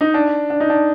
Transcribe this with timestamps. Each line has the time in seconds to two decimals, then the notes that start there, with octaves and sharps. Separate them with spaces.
0.01 D#4
0.14 D4
0.50 D4
0.60 D#4
0.70 D4